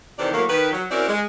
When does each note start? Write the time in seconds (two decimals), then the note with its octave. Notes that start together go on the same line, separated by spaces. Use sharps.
0.18 C3 D#3 E3 A4 C5 D5
0.32 A2 F#3 A3 A#3
0.48 D#3 B4
0.72 F#3
0.90 C4 C#4 E4 F#4 A#4 D5
1.08 G#3